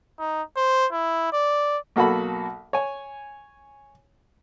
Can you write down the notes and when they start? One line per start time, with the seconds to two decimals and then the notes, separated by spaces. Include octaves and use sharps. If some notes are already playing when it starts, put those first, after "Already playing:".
0.19 D#4
0.56 C5
0.92 E4
1.33 D5
1.96 B1 A#3 F#4 A4 B5
2.73 C#5 G#5